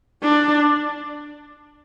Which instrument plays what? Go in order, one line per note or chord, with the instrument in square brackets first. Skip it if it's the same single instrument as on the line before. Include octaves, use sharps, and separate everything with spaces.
[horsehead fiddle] D4